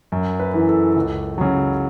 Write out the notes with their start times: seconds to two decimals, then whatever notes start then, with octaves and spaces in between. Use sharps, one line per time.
0.12 F#2
0.40 B4
0.54 E3
0.68 A4
0.96 C#2
1.38 C#3 F#3